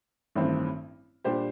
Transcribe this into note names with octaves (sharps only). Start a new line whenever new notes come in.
A1 G2 D#3 A3 C4
A#2 G3 D4 G4 C5